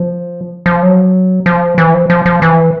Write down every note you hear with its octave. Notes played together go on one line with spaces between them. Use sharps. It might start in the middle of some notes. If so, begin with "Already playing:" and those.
Already playing: F3
F3
F#3
F3
E3
F3
F3
F3
E3